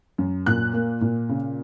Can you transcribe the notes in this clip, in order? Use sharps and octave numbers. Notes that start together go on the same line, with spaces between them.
F#2
A#2 F#6
A#3
A#2
C#3